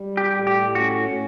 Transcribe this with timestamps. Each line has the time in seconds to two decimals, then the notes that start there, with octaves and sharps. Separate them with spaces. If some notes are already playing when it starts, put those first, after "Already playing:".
Already playing: G3
0.17 G4
0.31 A2
0.47 G4
0.75 C#4 F#4